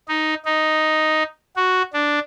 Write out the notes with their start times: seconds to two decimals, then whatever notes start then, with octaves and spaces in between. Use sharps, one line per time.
0.08 D#4
0.45 D#4
1.57 F#4
1.94 D4